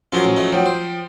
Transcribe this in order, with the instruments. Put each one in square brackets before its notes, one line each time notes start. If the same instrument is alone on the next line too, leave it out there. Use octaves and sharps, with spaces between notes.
[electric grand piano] F3 F#3 C#4 [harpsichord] F4 A#4 F5
[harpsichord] A1
A3 D#4
[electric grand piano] F3 G5 [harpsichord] F#3
[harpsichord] C5